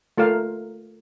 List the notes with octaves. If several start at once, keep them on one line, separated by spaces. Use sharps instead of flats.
A3 F4 A#4 F5